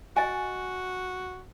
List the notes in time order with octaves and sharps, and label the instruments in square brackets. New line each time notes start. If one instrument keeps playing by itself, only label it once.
[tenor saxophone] F#4 [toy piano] D#5 G#5